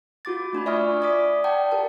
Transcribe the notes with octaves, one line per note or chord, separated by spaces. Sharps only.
F4 F#4 D6 A6
A3 D4 F4 B5
D5 E5 G#5 C#6 D#6 F6
D5 D6 D#6 B6
D5 F#5 G5 A5
G4 A#4 A5